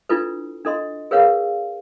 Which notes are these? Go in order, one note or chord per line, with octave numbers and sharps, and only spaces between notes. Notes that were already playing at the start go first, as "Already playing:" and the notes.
D4 E4 F4 A4 B4
D4 A4 D#5 C6
G#4 A#4 B4 C#5 F5 F#5